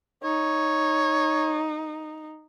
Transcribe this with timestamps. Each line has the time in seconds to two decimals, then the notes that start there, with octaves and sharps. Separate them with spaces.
0.24 D#4 C#5